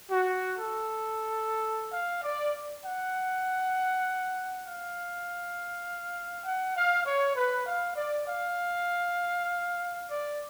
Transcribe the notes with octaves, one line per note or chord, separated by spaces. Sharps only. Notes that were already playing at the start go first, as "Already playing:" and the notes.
F#4
A4
F5
D5
F#5
F5
F#5
F5
C#5
B4
F5
D5
F5
D5